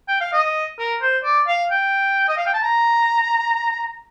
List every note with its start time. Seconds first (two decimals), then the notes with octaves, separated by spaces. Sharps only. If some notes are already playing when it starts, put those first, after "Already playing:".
0.08 G5
0.21 F5
0.33 D#5
0.79 A#4
1.02 C5
1.24 D5
1.48 F5
1.71 G5
2.28 D#5
2.37 F5
2.46 G5
2.54 A5
2.62 A#5